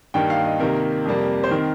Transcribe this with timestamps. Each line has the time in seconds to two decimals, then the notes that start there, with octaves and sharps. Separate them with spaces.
0.14 G2 D#3 A#3 G5
0.30 F5
0.45 D#5
0.60 C3 D#3 A#3 A#4
1.05 F2 C3 G3 A#3
1.44 C5
1.51 D#3 C4 A#4